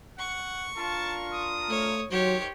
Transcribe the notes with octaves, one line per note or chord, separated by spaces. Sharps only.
F#5 C#6
D4 F4 A#4 A5
D#6
A3 C#5
D#3 F#3 G4 C5 C#5